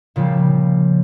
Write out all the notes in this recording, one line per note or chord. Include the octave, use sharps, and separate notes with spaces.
A#2 C#3 F3 G3 A#3